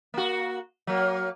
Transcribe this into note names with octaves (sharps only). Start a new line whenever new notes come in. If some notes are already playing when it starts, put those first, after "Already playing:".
A#3 F#4
F#3 A#3